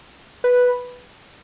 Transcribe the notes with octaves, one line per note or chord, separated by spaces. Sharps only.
B4